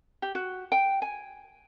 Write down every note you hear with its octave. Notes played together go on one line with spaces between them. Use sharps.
G4
F#4
G5
G#5